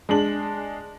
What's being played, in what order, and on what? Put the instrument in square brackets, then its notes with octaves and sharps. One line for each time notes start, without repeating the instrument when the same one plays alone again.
[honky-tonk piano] G#3 D4 F#7